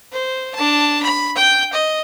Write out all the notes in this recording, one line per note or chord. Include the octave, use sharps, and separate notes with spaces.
C5
D4 A5
B5
G5 G6
D#5